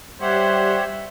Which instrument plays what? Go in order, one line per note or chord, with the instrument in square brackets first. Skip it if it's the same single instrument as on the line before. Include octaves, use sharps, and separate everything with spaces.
[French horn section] G3 [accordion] G4 C#5 F#5 [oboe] C5 [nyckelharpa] E5